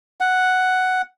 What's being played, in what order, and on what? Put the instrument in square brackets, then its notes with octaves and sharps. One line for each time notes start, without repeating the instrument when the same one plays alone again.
[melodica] F#5